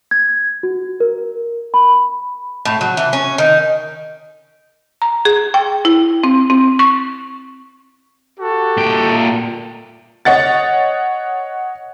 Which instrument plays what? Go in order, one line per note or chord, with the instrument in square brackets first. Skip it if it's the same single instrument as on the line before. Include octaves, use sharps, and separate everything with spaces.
[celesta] G#6
F#4
A#4
B5
[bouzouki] A2
F#3
E3
C#4
D#3
[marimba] A#5
G#4
G5
E4
C4
C4
C#6
[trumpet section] F#4 G4 A4
[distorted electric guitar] A#2 G5
[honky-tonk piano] C#5 D#5 F#5 A6